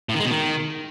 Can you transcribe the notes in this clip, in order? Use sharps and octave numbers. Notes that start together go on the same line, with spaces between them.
A2
D#3
G#3
B2
D#3